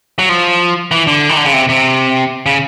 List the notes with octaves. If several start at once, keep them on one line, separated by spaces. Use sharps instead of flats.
F#3
F3
E3
D3
D#3
D3
C#3
C3
C3
C#3